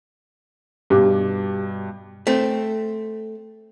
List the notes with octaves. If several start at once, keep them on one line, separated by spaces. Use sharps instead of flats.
G2 B2 G4 D6
A3 C4